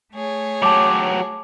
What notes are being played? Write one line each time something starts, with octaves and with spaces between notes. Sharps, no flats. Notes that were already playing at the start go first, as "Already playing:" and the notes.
A3 G#4 C#5
F#3 G4 A5 D6